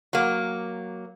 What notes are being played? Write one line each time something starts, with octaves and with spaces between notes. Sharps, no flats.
F#3 A#3